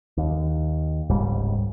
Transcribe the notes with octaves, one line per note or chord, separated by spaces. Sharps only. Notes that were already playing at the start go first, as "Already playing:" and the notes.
D#2
F1 C#2 G#2 G3